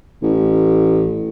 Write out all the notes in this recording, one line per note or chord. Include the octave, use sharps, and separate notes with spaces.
A1